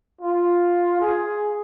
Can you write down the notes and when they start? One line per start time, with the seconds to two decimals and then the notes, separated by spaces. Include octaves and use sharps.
0.21 F4
1.01 G#4